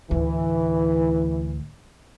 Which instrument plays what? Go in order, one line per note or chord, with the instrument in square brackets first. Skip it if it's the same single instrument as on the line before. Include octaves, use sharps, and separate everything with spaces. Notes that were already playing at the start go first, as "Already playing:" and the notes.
[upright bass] D2 A2 [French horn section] E3